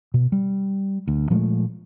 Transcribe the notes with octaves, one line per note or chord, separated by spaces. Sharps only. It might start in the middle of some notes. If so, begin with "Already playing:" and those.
B2
G3
D2
A#2 F3 G#3 A3